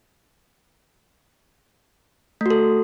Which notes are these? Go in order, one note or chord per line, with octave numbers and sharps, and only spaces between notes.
A3 F#4 A4